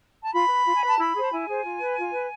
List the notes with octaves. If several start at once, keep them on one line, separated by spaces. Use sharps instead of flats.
A5
F4 B5
B4
F4
G#5
B4 A5
E4 B5
G#4 C5
A5
E4 G#5
G#4 C5
F4
B4
F4
B4